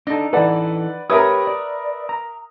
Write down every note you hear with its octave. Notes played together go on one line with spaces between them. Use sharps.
D4 D#4 A4
E3 A4 B4 D5 F#5
G4 A#4 B4 C#5 E5 D#6
D5
A#5